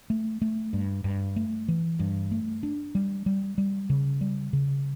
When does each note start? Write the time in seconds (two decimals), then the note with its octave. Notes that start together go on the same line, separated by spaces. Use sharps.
0.10 A3
0.42 A3
0.73 G2
1.04 G2
1.36 A3
1.68 E3
1.99 G2
2.32 A3
2.63 D4
2.95 G3
3.26 G3
3.58 G3
3.90 C#3
4.21 G3
4.53 C#3